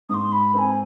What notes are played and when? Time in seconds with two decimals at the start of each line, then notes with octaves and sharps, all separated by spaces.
0.09 G#2 D#6
0.14 C6
0.32 B5
0.54 C4 G#5 B5